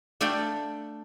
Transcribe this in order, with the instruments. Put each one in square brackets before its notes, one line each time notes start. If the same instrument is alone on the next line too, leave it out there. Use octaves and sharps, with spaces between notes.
[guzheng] A3 D4 A4 D5 F5 G5